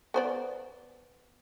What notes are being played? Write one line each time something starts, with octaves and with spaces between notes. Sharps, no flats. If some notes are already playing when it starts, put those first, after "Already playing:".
B3 C5 D5